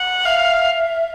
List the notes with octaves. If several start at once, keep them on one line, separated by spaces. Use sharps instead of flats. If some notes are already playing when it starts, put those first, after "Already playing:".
Already playing: F#5
E5 F5